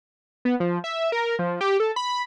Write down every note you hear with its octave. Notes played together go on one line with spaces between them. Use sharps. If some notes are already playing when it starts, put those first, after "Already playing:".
B3
F3
E5
A#4
F3
G4
A4
B5